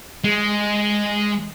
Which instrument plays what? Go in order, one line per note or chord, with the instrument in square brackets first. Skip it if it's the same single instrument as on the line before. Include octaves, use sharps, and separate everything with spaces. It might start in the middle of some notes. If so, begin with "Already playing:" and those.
[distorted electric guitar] G#3